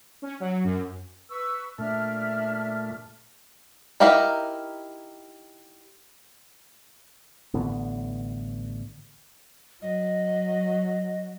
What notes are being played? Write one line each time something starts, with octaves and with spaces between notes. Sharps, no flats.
C#4
F#3
F#2
B4 C#6 E6
A#2 A3 D4 E5 F6
D#4 E4 G4 A#4 F5
A1 D3 B3
F#3 D#5